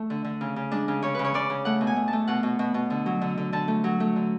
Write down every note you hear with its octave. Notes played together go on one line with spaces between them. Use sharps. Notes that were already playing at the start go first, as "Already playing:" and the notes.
Already playing: A3
D3
D3
C#3
C#3
G#3 D4
C#3
C#3 C#5
C#3 B4
C#5
C#3 D5
C#3
A3 F#5
B2
G#5
A3
A5
A3
B2 F#5
B2
B2
B2
D3
F#3
D3
D3
D3 A5
A3
F#3
A3
D3